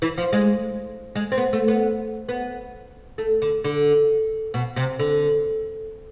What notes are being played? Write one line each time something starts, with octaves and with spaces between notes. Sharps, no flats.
E3
F3
G#3
G#3
C4
B3
A3
B3
B3
A3
D3
D3
B2
C3
D3